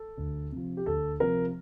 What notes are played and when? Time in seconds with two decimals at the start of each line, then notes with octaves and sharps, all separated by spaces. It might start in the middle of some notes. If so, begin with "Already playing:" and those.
Already playing: A4
0.17 D2
0.52 C3 F3
0.77 G4
0.86 D2 A4
1.20 C3 F3 A#4